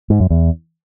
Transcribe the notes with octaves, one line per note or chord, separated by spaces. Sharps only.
G#2
F#2
E2